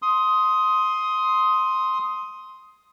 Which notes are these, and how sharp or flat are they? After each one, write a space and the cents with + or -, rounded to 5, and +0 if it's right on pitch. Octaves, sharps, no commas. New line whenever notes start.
C6 +0 D#6 +15